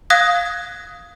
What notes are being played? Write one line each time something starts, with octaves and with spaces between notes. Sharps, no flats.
F5 D#6 F#6 G#6 A#6